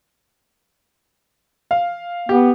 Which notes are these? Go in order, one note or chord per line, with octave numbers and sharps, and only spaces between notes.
F5
B3 G4